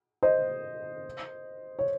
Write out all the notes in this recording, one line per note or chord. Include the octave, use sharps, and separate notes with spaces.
C5 D#5
C#5